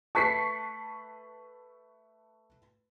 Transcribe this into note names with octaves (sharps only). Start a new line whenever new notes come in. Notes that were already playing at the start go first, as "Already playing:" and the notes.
A3 B4 A5 C#6 B6 C7